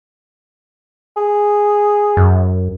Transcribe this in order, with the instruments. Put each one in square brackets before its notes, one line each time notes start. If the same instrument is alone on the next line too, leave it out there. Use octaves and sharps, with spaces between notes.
[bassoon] G#4
[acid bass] F#2